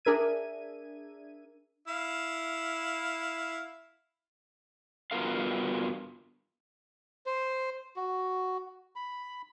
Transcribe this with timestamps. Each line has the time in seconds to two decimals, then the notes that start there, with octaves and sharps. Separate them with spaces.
0.05 D4 G#4 A#4 E5 G#6 D#7
1.88 E4 F5
5.11 G2 B3 F4 F#4 A#4 F5
7.26 C5
7.96 F#4
8.96 B5